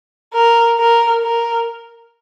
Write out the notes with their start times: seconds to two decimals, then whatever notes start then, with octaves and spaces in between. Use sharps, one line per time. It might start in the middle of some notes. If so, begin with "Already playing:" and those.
0.34 A#4
0.78 A#4
1.23 A#4